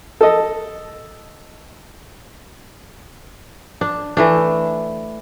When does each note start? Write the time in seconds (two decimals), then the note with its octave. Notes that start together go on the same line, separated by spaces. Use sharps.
0.21 A4 D#5
3.81 D4
4.17 E3 A3 D4